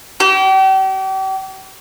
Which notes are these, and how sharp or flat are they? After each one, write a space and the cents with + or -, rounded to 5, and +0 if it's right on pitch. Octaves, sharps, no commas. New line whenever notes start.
G4 -40